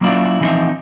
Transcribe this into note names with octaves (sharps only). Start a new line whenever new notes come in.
F#3 A#3 C#4 E4 F4 D5
E3 F3 G3 C4 D#4 E5